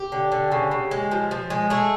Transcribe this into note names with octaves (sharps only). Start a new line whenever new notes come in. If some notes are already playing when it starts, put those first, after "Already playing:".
Already playing: G4
D3
D3
C#3
C#3
G#3
F3
F3
G#3
A3 G#4